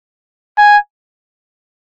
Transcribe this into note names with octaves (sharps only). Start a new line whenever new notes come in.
G#5